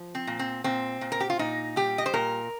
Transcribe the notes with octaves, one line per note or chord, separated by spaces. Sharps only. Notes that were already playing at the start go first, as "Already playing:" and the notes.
Already playing: F3
C4
A#2
C4
A#2 C4
A#2
A#4
G4
F4
A#2 D#4
G3 G4
D#5
C5
A#2 A#4